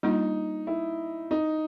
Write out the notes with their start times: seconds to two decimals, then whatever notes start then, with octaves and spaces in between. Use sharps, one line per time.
0.03 G3 A#3 D4 D#4 F4
0.67 E4
1.31 D#4